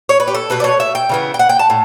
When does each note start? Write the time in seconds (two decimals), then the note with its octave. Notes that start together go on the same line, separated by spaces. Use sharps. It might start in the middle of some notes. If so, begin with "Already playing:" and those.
0.09 C#5
0.20 B4
0.28 G4
0.34 A4
0.50 B2 A3 B4
0.60 D5
0.64 C#5
0.80 E5
0.95 G5
1.09 C#3 E3 B3
1.34 G5
1.39 F#5
1.49 G5
1.59 A5
1.70 A2